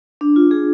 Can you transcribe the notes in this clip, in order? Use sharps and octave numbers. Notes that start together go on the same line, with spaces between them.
D4
F4
G#4